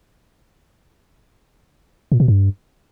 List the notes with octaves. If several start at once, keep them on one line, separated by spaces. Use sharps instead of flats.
A#2
B2
G2